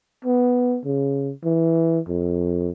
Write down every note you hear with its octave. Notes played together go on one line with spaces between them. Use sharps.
B3
C#3
E3
F2